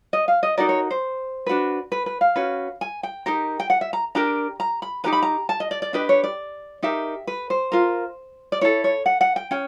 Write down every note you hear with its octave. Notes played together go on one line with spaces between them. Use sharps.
D#5
F5
D#5
D#4 F#4 A#4 D5
C#5
C5
D4 F#4 B4
B4
B4
F5
C#4 F#4 B4
G#5
G5
D#4 G4 A#4
G5
F#5
E5
A#5
D4 G4 A#4 A#5
A#5
B5
D#4 G4 B4 A#5
B5
A#5
A5
D#5
D5
D5
D4 G4 B4 D#5
C#5
D5
D#4 G4 A#4 E5
B4
C5
F4 A#4
D5
E4 A4 C#5
C#5
F#5
F#5
G5
C#4 G5